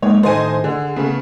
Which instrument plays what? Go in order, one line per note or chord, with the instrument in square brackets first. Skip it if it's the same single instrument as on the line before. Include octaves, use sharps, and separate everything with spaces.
[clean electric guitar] G#3 A#3 D#4 [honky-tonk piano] C#5
[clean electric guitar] A2 D#3 A4 [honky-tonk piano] C5 D#5 G#5
[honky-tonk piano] D3 [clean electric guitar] G#4
[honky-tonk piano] C#3 A3 [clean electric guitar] B3